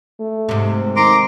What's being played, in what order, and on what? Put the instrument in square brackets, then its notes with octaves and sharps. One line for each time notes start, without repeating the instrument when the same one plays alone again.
[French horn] A3
[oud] G#2 C3
[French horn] D#3 [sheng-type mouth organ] A#5 C6 D6